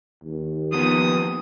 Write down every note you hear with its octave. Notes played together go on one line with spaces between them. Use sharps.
D#2
F3 B3 D#6